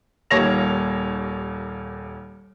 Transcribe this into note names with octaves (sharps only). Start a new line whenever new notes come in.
D#1 D#2 A#3 C#5 A#6 F7